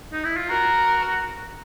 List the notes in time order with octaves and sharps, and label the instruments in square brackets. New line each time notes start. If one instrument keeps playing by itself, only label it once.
[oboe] D#4
E4
F4
[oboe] F#4 [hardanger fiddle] A#4